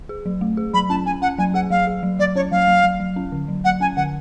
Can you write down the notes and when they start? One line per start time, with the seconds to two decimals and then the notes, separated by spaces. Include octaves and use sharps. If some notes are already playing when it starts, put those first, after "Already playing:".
0.09 G#4
0.26 F#3
0.41 A3
0.57 G#4
0.74 F#3 B5
0.90 C#4 A5
1.06 C#4 G#5
1.22 C#4 F#5
1.38 F#3 G#5
1.54 G#4 F#5
1.70 F#3 F5
1.87 G#4
2.03 F#3
2.19 F#3 D5
2.36 C#4 C#5
2.52 F#3 F5
2.68 F#3
2.84 F#3
3.00 F#3
3.16 C#4
3.32 D3
3.48 F#3
3.65 F#3 F#5
3.80 C#4 G#5
3.97 D3 F#5